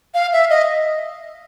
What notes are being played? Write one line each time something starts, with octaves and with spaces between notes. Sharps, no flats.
F5
E5
D#5